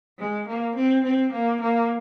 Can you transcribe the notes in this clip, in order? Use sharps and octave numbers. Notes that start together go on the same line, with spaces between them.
G#3
A#3
C4
C4
A#3
A#3